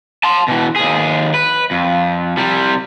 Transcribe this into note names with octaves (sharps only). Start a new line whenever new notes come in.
A5 C6
B2 E3
D#2 G#4
B4
F2
C3 G3